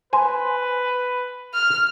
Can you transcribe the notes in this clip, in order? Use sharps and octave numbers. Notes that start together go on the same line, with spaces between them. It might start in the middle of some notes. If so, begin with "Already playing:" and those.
B4 C5 G#5
F6